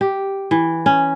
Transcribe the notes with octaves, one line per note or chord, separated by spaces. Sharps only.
G4
E3
C#4